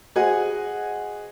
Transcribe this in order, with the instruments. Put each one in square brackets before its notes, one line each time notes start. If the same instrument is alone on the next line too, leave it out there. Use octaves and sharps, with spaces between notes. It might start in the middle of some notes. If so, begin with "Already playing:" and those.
[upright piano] F#4 G#4 C5 D#5 F#5 G#5